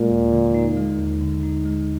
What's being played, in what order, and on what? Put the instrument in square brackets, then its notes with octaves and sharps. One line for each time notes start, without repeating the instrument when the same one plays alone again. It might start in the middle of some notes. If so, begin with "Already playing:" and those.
Already playing: [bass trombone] A#2 [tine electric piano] G#3
[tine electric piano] D#2
D3
D#4
G#3
D#2
D3
D#4
G#3